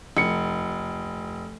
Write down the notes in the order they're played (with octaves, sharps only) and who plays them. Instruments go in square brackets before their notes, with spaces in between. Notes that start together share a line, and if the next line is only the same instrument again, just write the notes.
[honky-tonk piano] F1 C#7